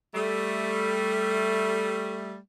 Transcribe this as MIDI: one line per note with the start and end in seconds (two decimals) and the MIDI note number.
0.14 2.37 55
0.14 2.37 57